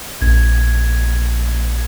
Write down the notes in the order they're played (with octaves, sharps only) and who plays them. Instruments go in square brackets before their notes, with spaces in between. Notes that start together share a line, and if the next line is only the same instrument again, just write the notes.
[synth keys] A#1 G#6